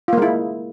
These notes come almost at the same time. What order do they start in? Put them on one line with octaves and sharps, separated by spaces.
F4 A#3 G#3 E4